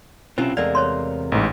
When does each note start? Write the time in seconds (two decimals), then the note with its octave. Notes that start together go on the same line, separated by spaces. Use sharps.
0.38 B1 C3 C4 C#4 E4 F4 C5
0.57 E2 C3 G#3 A3 A#4 D5 F5
0.75 C5 C#5 C6
1.32 A1 G#2